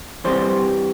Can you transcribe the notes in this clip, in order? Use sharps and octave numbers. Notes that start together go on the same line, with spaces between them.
E3 G3 C4 C5